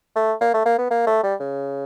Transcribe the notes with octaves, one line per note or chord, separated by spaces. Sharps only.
A3
A#3
A3
A#3
B3
A#3
A3
G3
C#3